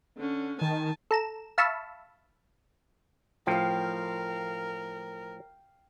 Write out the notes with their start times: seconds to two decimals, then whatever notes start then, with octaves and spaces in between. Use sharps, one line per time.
0.18 D3 C#4
0.61 D#3 G#5 A5
1.11 A4 A#5 E7
1.58 E5 F5 A5 B5 C#6 E6
3.47 A2 F3 A#4 F5 G5